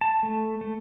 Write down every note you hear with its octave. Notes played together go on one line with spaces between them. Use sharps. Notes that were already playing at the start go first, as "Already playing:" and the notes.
A5
A3
A3